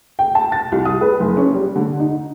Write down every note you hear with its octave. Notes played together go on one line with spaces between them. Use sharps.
G5
A5
A6
C2
D#6
B4
F#1
C#4
G3
D3
D#4